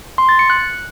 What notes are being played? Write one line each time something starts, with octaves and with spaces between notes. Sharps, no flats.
C6
A6
C#7
F#6